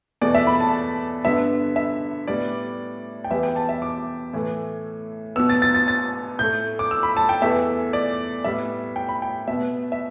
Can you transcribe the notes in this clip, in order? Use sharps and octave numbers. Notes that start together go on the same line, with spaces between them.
E2 B2 A3 D5
E5
B5
A5
G2 D3 B3 E5
E5
A2 G3 B3 D5
G5
E2 E3 G3 B3 E5
G5
A5
E5
D6
A2 E3 A3
B2 B3 E6
A6
A6
A6
A6
A2 A3 G6
D6
E6
B5
A5
G5
E2 E3 A3 E5
D5
A2 G3 B3 E5
G5
B5
G5
B2 B3 E5
E5